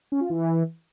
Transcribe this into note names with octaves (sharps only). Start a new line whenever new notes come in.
C#4
F4
E3